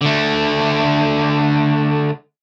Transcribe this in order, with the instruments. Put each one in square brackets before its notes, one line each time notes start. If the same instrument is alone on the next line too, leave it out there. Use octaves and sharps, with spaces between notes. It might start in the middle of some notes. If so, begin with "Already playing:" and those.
[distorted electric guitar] D3 A3